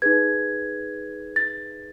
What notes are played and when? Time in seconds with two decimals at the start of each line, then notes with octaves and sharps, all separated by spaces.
0.02 D#4 G#4 B4 G#6
1.36 A6